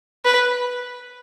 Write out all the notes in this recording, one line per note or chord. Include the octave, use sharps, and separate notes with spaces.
B4